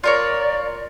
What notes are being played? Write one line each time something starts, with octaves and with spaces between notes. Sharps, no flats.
F4 A#4 C#5 D5